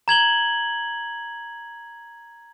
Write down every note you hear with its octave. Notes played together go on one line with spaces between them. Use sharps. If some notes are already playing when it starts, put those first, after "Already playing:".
A#5 G#6 F#7 G7